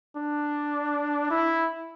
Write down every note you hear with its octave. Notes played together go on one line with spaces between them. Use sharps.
D4
E4